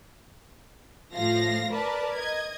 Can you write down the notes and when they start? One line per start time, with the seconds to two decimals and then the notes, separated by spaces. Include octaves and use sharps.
1.15 A2 F3 F5 A#6
1.72 A#4 B4 D5 A5
2.15 D#5 G#6